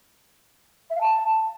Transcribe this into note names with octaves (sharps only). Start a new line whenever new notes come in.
E5
F5
A5